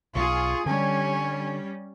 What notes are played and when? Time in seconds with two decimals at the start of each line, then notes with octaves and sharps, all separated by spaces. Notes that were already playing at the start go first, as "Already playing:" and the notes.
0.16 B1 F4 G#4 C#6 D#6
0.66 D3 G3 C#4 C#5 G#5